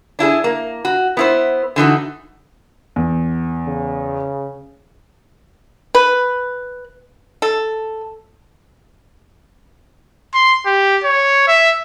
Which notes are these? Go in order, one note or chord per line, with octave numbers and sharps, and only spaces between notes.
D4 E4 F#4 G#4
A#3
F#4
B3 E4 C5
D3 E3 D#4 F#4
E2
C#3
B4
A4
C6
G4
C#5
E5